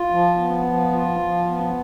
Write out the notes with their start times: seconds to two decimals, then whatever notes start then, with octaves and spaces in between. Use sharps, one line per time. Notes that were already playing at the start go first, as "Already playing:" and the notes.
Already playing: F4
0.10 F3
0.38 B3
0.65 F3
0.92 F4
1.19 F3
1.46 B3